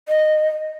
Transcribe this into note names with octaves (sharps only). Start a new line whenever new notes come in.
D#5